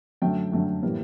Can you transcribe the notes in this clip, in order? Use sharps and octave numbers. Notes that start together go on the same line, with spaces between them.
F#2 D3 F#3 A3 G5
F#2 D3 F#3 A3
A2 E3 G3 A#3